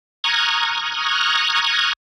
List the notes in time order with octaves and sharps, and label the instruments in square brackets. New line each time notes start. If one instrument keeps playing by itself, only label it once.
[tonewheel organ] A#5 C#6 D#6 F6 F#6 G#6